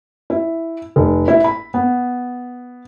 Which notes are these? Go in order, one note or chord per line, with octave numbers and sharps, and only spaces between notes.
E4
F1
E4
B5
B3